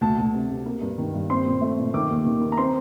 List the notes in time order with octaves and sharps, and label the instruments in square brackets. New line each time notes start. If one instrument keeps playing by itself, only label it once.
[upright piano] D2 A5
D2
C3
C3
A#3
G2
D#3
G2
C4 C6
A#2
A3
A#2
D#3 D6
D#2
D#3
A#3
A#5
C4 C6